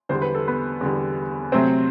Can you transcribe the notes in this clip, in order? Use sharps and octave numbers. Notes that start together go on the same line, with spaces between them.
E2 D3 G3 C5
B4
A4
B3 B4
E2 D3 G3
C3 F#3 A3 C4 C5